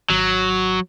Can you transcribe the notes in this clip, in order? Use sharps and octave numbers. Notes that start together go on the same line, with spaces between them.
G#1 F#3